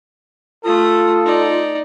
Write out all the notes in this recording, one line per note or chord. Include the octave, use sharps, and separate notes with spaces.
A3 F4 A4 D#6
D#4 D5